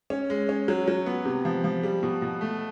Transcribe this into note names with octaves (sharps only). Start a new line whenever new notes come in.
C#4
G#3
C#4
F#3
F#3
B3
C3
F3
F3
G3
B2
B2
A3